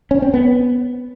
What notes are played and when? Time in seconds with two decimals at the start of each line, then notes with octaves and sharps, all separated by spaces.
0.11 C#4
0.22 C4
0.34 B3